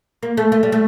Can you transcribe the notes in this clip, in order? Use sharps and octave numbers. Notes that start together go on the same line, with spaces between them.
A#3
A3
A3
G3
A3